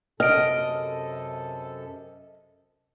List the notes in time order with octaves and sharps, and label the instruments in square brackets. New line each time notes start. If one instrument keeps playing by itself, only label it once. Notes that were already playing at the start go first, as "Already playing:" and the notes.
[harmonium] F#2 C3 A4 [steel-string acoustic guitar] D#5 [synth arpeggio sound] F6 D7